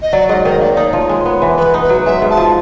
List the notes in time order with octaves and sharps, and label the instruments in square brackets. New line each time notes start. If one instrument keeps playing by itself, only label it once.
[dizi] D#5
[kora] F#3 [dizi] D5
[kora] G#2 [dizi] D#5
[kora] D#3 [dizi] D#5
[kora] A#3 [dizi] D5
[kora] D#4 [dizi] D5
[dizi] C#5
[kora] F3
G#3
B3
E3
[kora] B3 [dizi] B4
[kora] D#4
[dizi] B4
[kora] F#3
[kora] G#3 [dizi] E5
[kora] G#2
[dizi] A5
[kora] F3